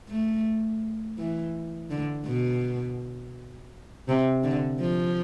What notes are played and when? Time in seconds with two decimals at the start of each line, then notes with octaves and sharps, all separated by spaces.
0.09 A3
1.18 E3
1.90 D3
2.26 B2
4.08 C3
4.43 D3
4.81 F3